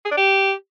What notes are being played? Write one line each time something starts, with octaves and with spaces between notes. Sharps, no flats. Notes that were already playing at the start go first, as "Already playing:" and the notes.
G#4
D4
G4